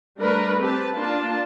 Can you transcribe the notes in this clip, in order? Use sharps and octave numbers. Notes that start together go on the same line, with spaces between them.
G3 A3 D4 A#4 B4
C4 G4 B4 A5
A#3 D4 F4 A5